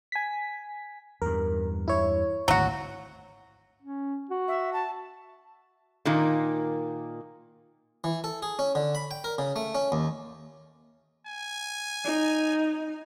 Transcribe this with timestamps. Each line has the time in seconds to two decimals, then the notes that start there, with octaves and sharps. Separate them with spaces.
0.12 G#5 B6
1.22 E2 G2 A#4
1.88 E4 C#5
2.48 G#1 D2 F#3 F#4
3.82 C#4
4.30 F#4
4.48 E5
4.73 A5
6.05 A#2 D#3 A#3
8.04 E3
8.24 A4
8.42 G#4
8.59 C#4
8.75 D3
8.95 B5
9.11 G5
9.24 A#4
9.38 C#3
9.56 A3
9.75 C#4
9.92 D#2
11.26 G#5
12.05 D#4